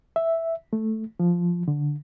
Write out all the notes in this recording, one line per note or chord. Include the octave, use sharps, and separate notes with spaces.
E5
A3
F3
D3